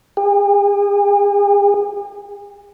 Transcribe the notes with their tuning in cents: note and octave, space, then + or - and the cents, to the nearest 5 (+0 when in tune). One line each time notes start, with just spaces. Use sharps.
G#4 -45